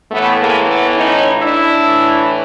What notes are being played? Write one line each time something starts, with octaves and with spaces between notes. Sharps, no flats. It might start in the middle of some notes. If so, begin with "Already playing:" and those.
A2 E3 A3 B3
G#3 A#3
A3 B3
C#4 D#4
D4 E4
A2 E3